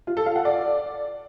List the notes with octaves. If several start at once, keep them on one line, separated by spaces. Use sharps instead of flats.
F4
A4
F5
F#5
D5